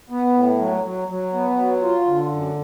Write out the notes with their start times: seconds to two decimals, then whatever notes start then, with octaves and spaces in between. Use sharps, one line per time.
0.10 B3
0.34 A2
0.59 F#3
0.84 F#3
1.08 F#3
1.33 B3
1.58 F#3
1.82 F4
2.06 D3
2.30 F#2